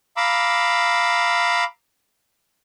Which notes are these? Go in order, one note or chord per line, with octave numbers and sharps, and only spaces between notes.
F5 A#5 B5 D6 E6